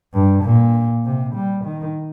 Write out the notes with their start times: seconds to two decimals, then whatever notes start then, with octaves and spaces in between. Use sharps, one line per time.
0.13 G2
0.43 A#2
1.05 C3
1.35 G3
1.65 D#3